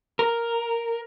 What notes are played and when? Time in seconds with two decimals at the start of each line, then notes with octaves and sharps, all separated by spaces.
0.19 A#4